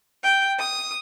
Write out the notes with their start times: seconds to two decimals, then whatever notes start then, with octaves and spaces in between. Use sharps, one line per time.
0.23 G5
0.58 D#6